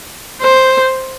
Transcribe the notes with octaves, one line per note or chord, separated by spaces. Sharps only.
C5